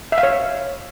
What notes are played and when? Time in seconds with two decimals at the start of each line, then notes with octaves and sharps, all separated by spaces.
0.12 E5
0.18 F5
0.23 C#5